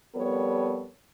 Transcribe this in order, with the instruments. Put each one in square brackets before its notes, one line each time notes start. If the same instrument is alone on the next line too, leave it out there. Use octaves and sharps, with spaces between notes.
[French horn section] F2 G3 B3 A4 A#4 C#5